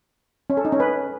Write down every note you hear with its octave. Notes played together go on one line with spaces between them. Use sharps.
C#4
A4
D#4
C#4
B4